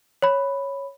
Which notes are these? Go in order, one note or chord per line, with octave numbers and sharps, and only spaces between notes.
C#5 B5